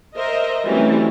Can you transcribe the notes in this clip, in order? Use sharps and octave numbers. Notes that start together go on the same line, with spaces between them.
A#4 C5 D#5 E5
E3 F#3 G3 A3 C4 C#4